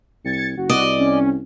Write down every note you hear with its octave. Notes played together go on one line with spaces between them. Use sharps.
C2 G#6 A6 C#7
F#1 F#4
C2 D5 D#5
C#4